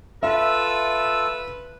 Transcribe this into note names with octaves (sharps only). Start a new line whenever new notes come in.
F4 A4 B4 E5 E6